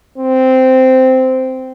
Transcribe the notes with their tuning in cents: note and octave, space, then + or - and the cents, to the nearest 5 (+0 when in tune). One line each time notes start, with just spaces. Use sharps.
C4 -10